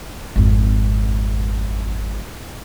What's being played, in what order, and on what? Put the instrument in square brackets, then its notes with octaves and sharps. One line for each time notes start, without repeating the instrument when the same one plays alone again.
[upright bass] G#1 F2